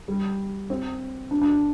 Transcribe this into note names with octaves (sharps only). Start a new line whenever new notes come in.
G3
C4
D4
D4